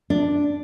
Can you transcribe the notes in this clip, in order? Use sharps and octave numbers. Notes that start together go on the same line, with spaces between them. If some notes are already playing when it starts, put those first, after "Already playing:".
D4